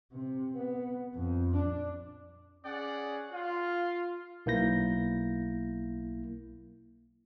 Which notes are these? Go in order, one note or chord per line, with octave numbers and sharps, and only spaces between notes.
C3
B3
F2
D4
C#4 G#4 D5 F#5
F4
B1 A#3 E4 G6 A#6